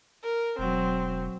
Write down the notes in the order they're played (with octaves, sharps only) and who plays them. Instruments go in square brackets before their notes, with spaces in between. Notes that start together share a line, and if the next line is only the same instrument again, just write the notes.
[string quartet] A#4
[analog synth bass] E1 [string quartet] F#3 C4